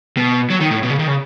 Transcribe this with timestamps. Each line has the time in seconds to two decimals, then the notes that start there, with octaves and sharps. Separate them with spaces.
0.17 B2
0.50 F#3
0.60 D#3
0.71 A2
0.83 B2
0.90 C#3
0.99 D#3
1.07 C#3